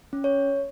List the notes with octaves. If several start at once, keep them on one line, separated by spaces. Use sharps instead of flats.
C#4
C#5